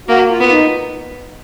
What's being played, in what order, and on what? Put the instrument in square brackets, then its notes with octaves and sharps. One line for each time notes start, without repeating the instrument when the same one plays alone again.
[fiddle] A#3 [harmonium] F#4
[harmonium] F4
[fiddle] B3 [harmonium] F4
[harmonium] D#4